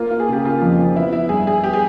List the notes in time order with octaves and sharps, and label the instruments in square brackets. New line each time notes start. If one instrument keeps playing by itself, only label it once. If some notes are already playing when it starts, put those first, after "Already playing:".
Already playing: [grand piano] A#3 [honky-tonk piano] F4
[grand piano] A#3
[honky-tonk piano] G#4
[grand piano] C#3 [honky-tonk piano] G4
[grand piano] A#3 [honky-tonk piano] F4
[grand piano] F2
F3
[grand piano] B3 [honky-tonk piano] E4
[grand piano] B3 [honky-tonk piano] E4
[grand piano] G2 [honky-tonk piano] G#4
[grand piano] G2 [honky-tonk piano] G#4
[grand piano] B3 [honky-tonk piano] G4
[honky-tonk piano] G#4